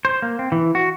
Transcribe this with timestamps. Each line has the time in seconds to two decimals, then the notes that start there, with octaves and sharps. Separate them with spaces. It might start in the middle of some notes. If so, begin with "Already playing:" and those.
0.05 C5
0.22 A#3
0.39 C4
0.52 E3
0.75 F#4